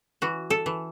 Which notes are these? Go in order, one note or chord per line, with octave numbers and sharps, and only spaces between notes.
E3 F#4
A4
E3